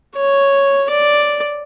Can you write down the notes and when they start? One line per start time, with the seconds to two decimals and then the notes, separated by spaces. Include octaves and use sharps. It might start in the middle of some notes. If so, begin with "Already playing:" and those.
0.16 C#5
0.90 D5